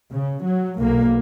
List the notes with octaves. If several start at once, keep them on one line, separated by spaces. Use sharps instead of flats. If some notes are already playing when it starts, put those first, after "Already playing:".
C#3
F#3
B1 A#3